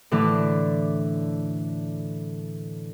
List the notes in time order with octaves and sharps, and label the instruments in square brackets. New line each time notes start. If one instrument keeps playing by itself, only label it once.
[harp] A2 D3 E3 D4